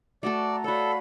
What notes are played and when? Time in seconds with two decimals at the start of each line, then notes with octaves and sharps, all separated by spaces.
0.23 A3 F#4 A4 D5
0.48 A#5
0.64 F#4 A4 C#5 D5 F5 B5